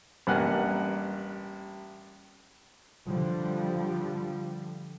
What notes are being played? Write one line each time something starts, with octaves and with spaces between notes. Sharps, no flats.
A1 G2 A#3 F#5 G#5 F#6
D3 F3 G3